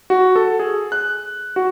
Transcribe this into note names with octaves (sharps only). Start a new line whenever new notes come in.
F#4
A4
G#4
F#6
F#4